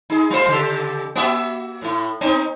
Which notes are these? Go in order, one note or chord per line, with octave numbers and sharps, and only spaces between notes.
D#4 G#4
G3 F4 C5
C#3 G4 A4
A#3 F#4 E5
A2 E4
B3 C4 D#4